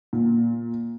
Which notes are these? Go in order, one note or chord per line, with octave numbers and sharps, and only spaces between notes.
A#2